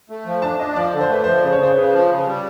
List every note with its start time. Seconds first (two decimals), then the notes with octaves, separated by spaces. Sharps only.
0.10 A3
0.26 F3
0.42 D4 A5
0.59 D4 D#5
0.76 F3 D5
0.93 D3
1.01 C5
1.09 A3 B4
1.24 F3 C5
1.40 C#3 D5
1.52 C#5
1.59 C#3 C5
1.76 C#3 B4
1.92 F3
2.09 C#3
2.26 G3